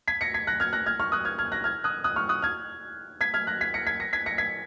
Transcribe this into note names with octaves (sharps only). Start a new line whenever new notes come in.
G#6 B6
A#6 C#7
G#6 B6
F#6 A#6
F6 G#6
F#6 A#6
F6 G#6
C#6 F6
D#6 F#6
F6 G#6
F6 G#6
F#6 A#6
F6 G#6
D#6 F#6
D#6 F#6
C#6 F6
D#6 F#6
F6 G#6
G#6 B6
F6 G#6
F#6 A#6
G#6 B6
A#6 C#7
G#6 B6
A#6 C#7
G#6 B6
A#6 C#7
G#6 B6